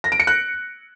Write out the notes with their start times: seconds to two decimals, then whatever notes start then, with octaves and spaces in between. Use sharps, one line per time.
0.04 A#6
0.12 D7
0.20 C#7
0.27 F#6